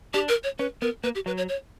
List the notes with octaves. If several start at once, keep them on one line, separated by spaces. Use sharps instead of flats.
D4 G4
A#4
C#5
C#4 B4
B3 A#4
A#3 B4
G4
F#3 B4
C#5
C#5